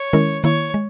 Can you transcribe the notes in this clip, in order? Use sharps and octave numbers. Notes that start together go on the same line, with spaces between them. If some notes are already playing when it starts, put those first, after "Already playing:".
Already playing: C#5
D#3 G#3 C#4 E4 A#4
D#3 A#3 E4 C#5
G#3